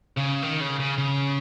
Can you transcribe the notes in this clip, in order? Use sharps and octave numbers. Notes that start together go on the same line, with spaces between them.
C#3
D#3
C#3
C#3
C#3